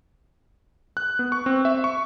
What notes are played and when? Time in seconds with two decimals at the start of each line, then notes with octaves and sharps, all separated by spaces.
0.97 F#6
1.19 B3
1.32 C#6
1.46 C4
1.65 E5
1.84 C#6